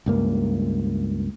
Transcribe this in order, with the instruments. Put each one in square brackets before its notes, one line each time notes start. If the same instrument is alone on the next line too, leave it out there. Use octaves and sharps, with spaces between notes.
[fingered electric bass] C#2 G2 A#3